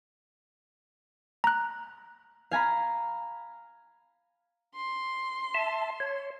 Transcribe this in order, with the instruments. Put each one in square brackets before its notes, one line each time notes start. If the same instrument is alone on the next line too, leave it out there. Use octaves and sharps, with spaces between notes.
[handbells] A#5 F#6
[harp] F5 G#5 A#5 B5
[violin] C6
[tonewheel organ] E5 A5
C#5